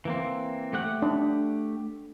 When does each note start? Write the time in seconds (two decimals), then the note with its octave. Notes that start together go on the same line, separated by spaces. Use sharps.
0.05 E3 A#3 C4
0.73 A3 G4 F#5
1.02 D4